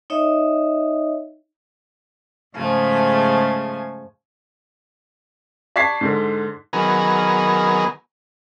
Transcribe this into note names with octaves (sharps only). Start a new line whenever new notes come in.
D#4 C#5 D#5 E5
G#2 C#3 F3 A3 G#5
D5 A5 C#6 G#6 B6 C7
G#2 D3
D#3 F#3 B3 G#4 A#4